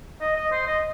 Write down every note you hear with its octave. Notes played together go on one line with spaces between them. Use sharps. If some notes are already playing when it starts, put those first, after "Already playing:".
D#5
D#5
C5
D#5